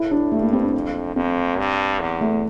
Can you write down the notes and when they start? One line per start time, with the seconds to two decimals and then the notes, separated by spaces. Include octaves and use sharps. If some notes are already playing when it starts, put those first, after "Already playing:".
Already playing: A2 E4
0.11 D4
0.32 G2 A3
0.42 A#3
0.53 C4
0.63 D4
0.74 F2
1.16 F2 C4
1.58 G2
2.00 E2
2.21 A3